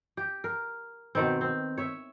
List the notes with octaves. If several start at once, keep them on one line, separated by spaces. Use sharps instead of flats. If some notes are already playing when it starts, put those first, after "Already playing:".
G4
A#4
B2 D#3 C4
C4
C#5 E5